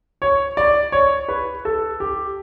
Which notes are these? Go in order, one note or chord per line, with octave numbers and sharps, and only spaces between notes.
C#5
D5
C#5
B4
A4
G4